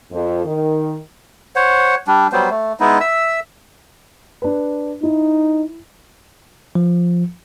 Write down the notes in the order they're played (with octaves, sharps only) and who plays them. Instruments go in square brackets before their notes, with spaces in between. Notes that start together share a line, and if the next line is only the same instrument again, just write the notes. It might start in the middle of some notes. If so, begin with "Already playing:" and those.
[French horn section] F2
D#3
[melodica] C5 C#5 F#5
G3 D4
F#3 G3 B3 C5
A3
G#3 B3 D#4 E4
E5 E6
[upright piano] D4 B4
[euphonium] D#4 [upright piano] E4
[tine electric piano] F3